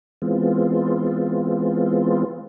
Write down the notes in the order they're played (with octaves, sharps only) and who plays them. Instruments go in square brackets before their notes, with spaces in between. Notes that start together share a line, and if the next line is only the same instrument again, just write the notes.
[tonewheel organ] E3 G#3 B3 C4 F4